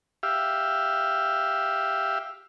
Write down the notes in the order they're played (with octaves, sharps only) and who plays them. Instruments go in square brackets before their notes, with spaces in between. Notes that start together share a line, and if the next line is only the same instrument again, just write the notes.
[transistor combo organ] G4 E5 F5